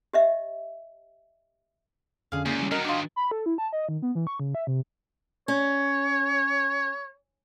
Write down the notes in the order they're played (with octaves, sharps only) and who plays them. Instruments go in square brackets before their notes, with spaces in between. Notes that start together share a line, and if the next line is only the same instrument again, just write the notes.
[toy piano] G4 D#5 E5
[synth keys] F2 D3 [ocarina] C#4 [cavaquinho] G#4 F5
[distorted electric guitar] C#2 [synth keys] A#3 E4 [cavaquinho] G#4 D5
[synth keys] E3 F#3 G3
[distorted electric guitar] D#3 F#3 [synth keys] F#4 D#5 [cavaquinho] A#4
[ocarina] D4 [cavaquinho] F4 A5 D6
[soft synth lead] B5
A4
E4
A5
D#5
D#3
B3
E3
C#6
C#3
E5
C3
[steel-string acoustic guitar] C#4 [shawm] C#5